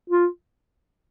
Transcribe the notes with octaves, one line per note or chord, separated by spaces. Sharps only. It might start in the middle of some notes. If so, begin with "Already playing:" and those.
F4